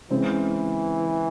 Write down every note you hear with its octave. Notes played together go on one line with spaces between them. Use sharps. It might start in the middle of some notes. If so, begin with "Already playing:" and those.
C#3 E3 G#3 C4